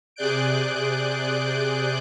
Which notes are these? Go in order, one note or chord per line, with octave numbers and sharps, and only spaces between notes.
C3 G#4 D5 F#6 G6 D7